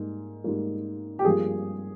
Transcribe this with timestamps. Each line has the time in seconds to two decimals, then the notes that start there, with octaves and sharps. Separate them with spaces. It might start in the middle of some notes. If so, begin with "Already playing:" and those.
Already playing: G#2 G3 A#3
0.44 G#2 G3 A#3
1.19 G4
1.25 G2 F3 A#3 G#4